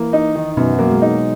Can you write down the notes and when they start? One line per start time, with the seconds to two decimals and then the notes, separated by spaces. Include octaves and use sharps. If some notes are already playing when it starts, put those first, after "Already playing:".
Already playing: E3 A#3 E4
0.13 D#4
0.35 D#3
0.57 F#2 B2 B3
0.79 F#3 A#3
0.91 G#3
1.02 D#4